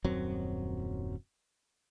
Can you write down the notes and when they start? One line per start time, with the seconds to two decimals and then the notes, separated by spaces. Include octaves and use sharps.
0.04 D#1 F#2 F#3 C4